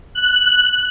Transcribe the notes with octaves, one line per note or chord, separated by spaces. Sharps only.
F#6